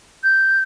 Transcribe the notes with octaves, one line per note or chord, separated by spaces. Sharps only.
G6